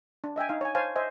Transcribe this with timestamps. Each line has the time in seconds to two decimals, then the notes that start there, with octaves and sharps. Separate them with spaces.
0.24 D4
0.36 D#5 E5 G5 G#5
0.49 D#4 F5
0.61 C#5 G#5
0.75 C5 C#5 F5 G#5 A5
0.96 C5 D#5 E5 G#5